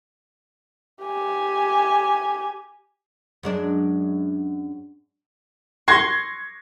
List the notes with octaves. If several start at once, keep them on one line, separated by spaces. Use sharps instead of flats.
G4 G#5
F#2 G#3 D4
C6 C#6 G#6 A#6 C7